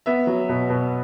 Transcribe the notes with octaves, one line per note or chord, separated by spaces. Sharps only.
B3 E5
F#3
B2
B2